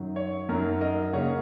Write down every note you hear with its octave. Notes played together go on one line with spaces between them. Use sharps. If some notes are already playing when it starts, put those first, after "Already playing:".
Already playing: F#2 D#3 F#3
C#5
F#2 D#3 F#3 A#4
A#4 D#5
C#3 A#3 C#5 F#5